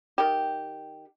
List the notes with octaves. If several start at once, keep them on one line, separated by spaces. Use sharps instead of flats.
D#3 G4